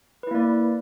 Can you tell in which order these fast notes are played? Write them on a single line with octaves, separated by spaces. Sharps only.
B4 E4 A#3 D5